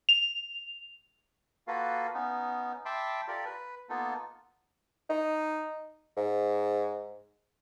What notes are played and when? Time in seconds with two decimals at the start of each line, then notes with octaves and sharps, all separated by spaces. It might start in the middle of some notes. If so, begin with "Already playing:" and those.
0.09 F7
1.68 A#3 F4 F#4 A4 B4 F5
2.14 B3 C#4 D#4
2.85 E5 G5 A5 B5 C6 D6
3.28 F4 G4 A4 A#4 D5
3.45 B4
3.89 A#3 B3 D#4 F4 A4
5.10 D#4
6.17 G#2